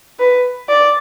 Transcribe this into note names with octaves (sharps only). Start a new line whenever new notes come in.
B4
D5